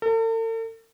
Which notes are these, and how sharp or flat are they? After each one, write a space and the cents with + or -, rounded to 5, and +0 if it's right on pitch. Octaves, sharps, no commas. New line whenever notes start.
A4 +45